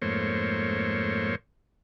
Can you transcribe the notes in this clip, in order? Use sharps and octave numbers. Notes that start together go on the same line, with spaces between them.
F2 G#2 A3 A#3 C5 C#5